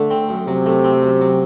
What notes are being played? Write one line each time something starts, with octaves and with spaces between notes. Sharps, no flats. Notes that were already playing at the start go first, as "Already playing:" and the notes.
Already playing: D3 A3
C4
F#2
C3 F#3
A3
C4
F#2
F#3